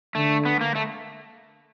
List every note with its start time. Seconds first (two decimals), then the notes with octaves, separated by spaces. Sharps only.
0.15 D3 A3
0.45 B3
0.61 A#3
0.75 A3